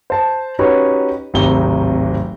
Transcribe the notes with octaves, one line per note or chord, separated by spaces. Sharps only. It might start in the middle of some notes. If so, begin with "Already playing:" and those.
C5 A5
C#4 D#4 F#4 G4 B4 C#5
D1 G#1 C3 D#4 G4 G7